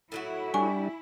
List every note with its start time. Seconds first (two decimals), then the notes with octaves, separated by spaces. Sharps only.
0.12 A2 F#3 E4 F#4
0.54 G3 D4 G#5 C#6